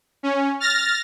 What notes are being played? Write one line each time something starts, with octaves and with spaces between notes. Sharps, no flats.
C#4
F6 A6 A#6